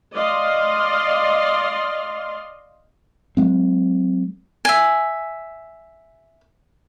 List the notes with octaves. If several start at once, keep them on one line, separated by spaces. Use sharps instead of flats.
D5 D#5 F5 C6
F#3 G#3 C4
E5 G#5